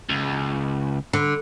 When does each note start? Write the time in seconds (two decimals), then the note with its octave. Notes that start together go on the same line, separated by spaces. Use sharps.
0.10 C#2
1.13 D3